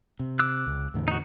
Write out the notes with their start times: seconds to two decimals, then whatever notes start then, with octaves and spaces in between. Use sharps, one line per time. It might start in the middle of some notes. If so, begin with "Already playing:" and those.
0.20 C3
0.39 D6 E6 F#6
0.66 C#2
0.94 E2 A2 D3
1.08 D#4 F#4